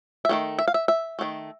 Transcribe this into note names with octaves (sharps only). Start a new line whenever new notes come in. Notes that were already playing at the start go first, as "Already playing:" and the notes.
E5
D#3 F#3 A3
E5
F5
E5
E5
D#3 F#3 A3